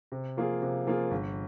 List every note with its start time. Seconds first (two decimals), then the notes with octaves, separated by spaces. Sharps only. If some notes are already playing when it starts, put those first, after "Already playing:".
0.12 C3
0.37 F3 A#3 F4 G#4
0.62 C3
0.87 F3 A#3 F4 G#4
1.11 G1